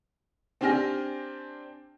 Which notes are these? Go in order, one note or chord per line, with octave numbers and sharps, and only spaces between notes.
C4 D4 G4 G#5 F6 A#6